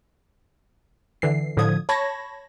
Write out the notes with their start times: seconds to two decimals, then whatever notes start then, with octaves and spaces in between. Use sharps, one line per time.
1.22 D3 E3 C7
1.57 A2 D3 F3 D#6 G#6
1.89 C#5 A5 B5 C#6 G#6 A#6